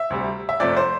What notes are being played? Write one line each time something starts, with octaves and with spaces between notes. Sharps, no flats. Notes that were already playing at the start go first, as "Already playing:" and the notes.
Already playing: E5
D2 C3 G3
E5
G1 F2 C3 F3 A3 D5
C5